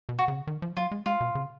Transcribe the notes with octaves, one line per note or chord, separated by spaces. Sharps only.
B2
F#4
C#3
D#3
F3
F#3 F4
G#3
G#3 F4
B2
C#3